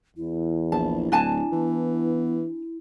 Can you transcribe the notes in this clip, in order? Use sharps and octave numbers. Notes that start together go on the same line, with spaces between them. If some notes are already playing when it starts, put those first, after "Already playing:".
E2 E4
A#1 A5
D1 D4 G#5 A5
E3 B3
E4